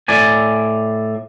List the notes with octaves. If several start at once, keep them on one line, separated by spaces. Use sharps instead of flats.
A2 D5 G#5